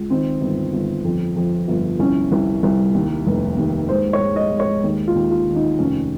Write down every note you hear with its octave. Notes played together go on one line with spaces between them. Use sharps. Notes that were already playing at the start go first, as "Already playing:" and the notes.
Already playing: C#2
D#3 C4
G1
G1
F2
F2
G1
C2 C#4
C2
C2
D#2
F1
D#2
G#2 C5
C#5
G#2
D#5
G#2
C#5
D#2
F4
D#2
F4
D#3
D#4
F1 C#4